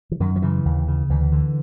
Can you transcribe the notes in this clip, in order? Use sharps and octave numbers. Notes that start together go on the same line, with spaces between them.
E3
F#2 D#3
F3
C#3 E3
D#2
C#3
D2 E3
D3